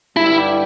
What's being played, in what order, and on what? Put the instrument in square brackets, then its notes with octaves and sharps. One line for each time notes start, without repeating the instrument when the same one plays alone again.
[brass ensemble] G2 D3 G3 [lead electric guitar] E4